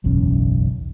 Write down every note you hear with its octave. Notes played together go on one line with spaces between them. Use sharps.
F#1 B1 E2 C#4